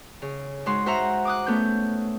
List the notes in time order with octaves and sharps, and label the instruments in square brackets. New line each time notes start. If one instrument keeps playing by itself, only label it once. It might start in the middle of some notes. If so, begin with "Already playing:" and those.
[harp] C#3
G#2 G#3 F#4 C6
F#4 C5 E5 F#5 A#5
D6 D#6 F#6
A3 B3 C#4 G6